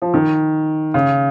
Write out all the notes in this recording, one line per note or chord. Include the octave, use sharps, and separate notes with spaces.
F3
D#3
C#3